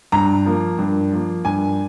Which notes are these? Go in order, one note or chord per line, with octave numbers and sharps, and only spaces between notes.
G2 A#5
F3 A#3
G2
F3 A#3
G2 G#5